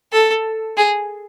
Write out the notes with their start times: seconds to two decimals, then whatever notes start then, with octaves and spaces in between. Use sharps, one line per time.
0.12 A4
0.77 G#4